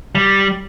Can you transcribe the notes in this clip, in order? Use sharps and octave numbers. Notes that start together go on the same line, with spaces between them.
G3